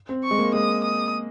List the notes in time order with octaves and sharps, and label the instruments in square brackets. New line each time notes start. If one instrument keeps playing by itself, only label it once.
[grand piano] C4
[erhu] C#6
[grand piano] G#3
A#3
[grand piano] G#3 [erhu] D#6
[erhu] D#6